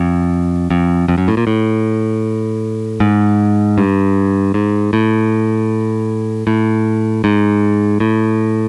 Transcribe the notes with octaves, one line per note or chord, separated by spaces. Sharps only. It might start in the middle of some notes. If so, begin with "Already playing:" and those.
Already playing: F2
F2
F2
F#2
A2
A#2
A2
G#2
G2
G#2
A2
A2
G#2
A2